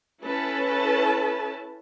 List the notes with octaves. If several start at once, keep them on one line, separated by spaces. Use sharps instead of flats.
C#4 E4 A4 B4 A5